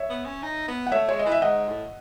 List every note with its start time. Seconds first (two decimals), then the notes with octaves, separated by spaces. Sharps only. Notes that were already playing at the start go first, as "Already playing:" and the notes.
Already playing: C#5 E5
0.10 B3
0.25 C#4
0.43 D#4
0.68 B3
0.86 F#5
0.92 A3 C#5 E5
1.09 G#3 C#5
1.19 D#5
1.26 E3
1.32 E5
1.42 G#2 D#5 F#5
1.68 A2